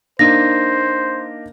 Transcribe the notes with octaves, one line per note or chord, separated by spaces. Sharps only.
A#3 D4 D#4 C5 A#6